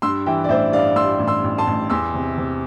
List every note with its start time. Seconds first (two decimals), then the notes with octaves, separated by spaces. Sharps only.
0.02 G2 C6 E6
0.26 E3 E5 G5
0.44 D5
0.49 A1 C5 E5
0.72 G2 D5 F5
0.96 G2 C6 E6
1.19 A1
1.28 C6 E6
1.44 A1
1.58 A5 C6
1.67 A1
1.90 E2 C6 E6
2.14 C3
2.38 C3